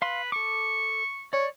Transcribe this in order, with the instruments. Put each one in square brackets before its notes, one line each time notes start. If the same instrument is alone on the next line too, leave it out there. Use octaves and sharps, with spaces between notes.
[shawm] B4 [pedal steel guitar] F5 C6
[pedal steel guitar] A4 D6 [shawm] C#6
[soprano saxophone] C#5 [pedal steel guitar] D5